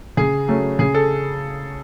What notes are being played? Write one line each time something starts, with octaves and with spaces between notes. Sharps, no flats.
C#3 G#4
F#3 A3 C#4
C#3 G#4
A4